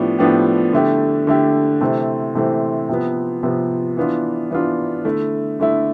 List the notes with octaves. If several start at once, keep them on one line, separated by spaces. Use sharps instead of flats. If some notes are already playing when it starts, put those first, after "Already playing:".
Already playing: A2 F3 B3 D4 G4
A2 F3 B3 D4 G4
D3 A3 E4 G4
D3 A3 E4 G4
C3 E3 A3 C4
C3 E3 A3 C4
C3 F3 B3
C3 F3 B3
E3 B3 D4 F4
E3 B3 D4 F4
D3 A3 E4
D3 A3 E4